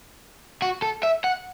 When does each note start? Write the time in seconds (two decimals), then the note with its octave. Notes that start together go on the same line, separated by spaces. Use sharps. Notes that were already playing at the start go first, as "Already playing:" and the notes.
0.62 F#4
0.82 A4
1.03 E5
1.24 F#5